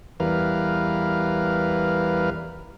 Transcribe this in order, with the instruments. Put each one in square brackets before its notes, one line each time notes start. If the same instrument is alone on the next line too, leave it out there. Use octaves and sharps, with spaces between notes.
[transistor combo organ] E2 E3 G3 A#4 B4 F5